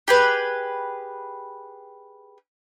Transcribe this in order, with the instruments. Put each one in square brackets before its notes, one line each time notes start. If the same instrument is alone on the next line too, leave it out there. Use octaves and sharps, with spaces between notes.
[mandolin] G4 G#4 B4